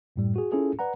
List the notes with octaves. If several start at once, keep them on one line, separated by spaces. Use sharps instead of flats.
F#2 A2 G3
F#4 G#4
C#4 E4 F4 G#4 A4
B4 D5 F#5 A#5